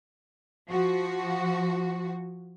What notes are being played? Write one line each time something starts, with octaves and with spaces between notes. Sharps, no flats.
F3 F#4